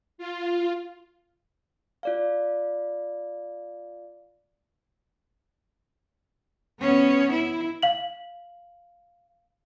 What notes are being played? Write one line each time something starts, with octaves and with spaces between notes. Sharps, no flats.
F4
F4 D5 F5
B3 C#4
E4
F5 F#7